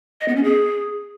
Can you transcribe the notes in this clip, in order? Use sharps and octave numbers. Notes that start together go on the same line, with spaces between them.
D#5
B3
C#4
G#4